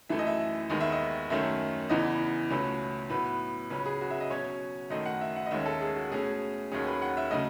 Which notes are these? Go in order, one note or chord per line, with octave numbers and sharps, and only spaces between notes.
F#2 E3 A3 E5
D#5
E5
D#2 D#3 G#3 B3 D#5
E5
D#5
F#2 D#3 A3 C#4 E5
E2 C#3 E3 B3 D#5
C#2 B2 A3 C#4 B4
A2 F#3 B3 B4
C#2 C#3 F#3 C#4 B4
G#4
F#4
E5
D#5
B2 F#3 C#4 C#5
F#2 D#3 F#3 A3 D#5
F#5
E5
F#5
D#5
D#2 D#3 G#3 C#4 E5
A4
G#4
F#4
B2 A3 C#4 G#4
D#2 D#3 F#3 C#4 G#4
B4
F#5
E5
C#3 F#3 A3 D#5